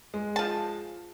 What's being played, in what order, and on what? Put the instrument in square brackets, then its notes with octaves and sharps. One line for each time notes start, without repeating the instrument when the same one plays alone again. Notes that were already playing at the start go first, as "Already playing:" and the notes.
[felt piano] G#3
[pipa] F3 A5